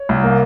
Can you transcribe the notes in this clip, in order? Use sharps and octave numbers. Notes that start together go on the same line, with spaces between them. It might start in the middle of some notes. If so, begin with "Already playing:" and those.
Already playing: C#5
C2
A#3